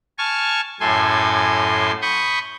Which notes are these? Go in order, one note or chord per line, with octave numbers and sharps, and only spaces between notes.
G#5 A5 C#6 F6
F#2 A2 A4 G#5 C6
B5 C#6 D#6 G6